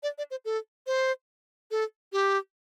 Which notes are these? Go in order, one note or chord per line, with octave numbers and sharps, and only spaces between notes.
D5
D5
C5
A4
C5
A4
G4